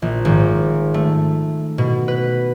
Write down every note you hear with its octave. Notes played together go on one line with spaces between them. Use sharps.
A#1
G#1
A3
B2
B4